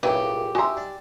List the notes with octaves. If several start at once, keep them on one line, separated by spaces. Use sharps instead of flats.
C2 A#2 C#3 F#3 G3 E4 G4 B4
D#4 F#4 E5 G#5 A#5 C6
D4